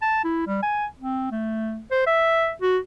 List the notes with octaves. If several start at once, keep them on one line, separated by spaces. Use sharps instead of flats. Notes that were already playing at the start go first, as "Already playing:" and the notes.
A5
E4
G3
G#5
C4
A3
C5
E5
F#4